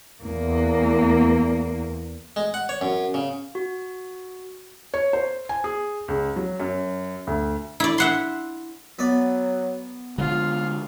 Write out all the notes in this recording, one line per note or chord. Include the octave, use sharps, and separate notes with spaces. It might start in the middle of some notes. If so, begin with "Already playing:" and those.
E2 A#3
G#3
F#5
C#5
F#2
C#3
F#4
C#5
C5
G#5
G#4
C#2
F#3
F#2
D2
E4 D5
E5 F#5 C6
F#3 B3 D5
D3 F3 G#3 F4